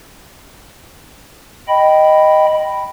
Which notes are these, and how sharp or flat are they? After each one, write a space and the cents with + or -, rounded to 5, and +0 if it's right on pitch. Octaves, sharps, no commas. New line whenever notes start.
D#5 +0 G5 -10 B5 +0